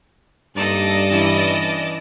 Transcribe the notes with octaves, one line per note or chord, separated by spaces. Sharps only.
G2 A#3 D#4 A4 D5 D#5 A5
E3 C#4 E4